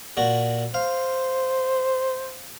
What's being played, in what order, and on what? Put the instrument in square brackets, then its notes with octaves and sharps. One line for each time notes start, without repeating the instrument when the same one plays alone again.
[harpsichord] A#2 F#4
[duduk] C5 [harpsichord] F5